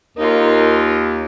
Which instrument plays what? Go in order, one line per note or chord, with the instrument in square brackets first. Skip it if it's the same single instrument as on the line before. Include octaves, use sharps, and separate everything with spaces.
[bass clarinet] D#2 [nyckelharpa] D#4 F4 [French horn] A#4